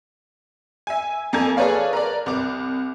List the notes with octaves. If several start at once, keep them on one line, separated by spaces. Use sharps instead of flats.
E5 G#5
F2 A#3 A4 G#5 G#6
G#4 A4 B4 C#5 D5 F5
A#4 B4 D5
C2 D6